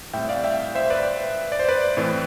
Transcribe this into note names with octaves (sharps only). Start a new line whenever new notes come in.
A2 G3 C4 E5 G5
D5 F5
E5 G5
C5 E5
B4 D5
D5
C5
B4 D5
A2 E3 A3 C4